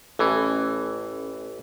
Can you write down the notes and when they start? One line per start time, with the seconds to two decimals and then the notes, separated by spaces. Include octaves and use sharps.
0.19 A1 A2 E3 A3 C#4